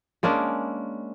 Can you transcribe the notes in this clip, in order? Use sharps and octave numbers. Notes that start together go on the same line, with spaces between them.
G#3 A#3 C#4 D4